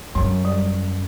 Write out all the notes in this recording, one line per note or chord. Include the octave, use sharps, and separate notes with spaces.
F#2 F#3
G3